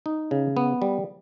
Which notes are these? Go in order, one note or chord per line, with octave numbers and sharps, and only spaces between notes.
D#4
C#3
B3
G3